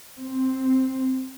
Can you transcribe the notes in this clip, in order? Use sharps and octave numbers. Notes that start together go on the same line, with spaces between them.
C4